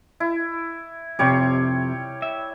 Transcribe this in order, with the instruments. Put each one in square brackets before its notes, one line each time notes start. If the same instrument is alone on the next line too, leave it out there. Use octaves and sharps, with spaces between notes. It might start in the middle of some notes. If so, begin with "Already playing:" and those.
[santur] E4
[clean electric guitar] F2 A2 C3 [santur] G3 C#5 G5
[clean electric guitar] E5